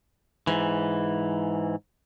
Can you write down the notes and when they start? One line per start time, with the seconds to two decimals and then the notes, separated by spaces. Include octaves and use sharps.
0.47 G#2 E3